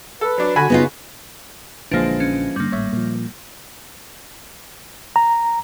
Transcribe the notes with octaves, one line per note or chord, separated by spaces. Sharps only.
A4 B4
F#3 D4
D3 F#4 G#5 B5
C#3 B3 D#4 F4
A#1 D3 E3 F3 G#3 A#3 D4
C#4
G2 D3 G3 A#3
G#1 A2 C#5 E5
A#2 F3
A#5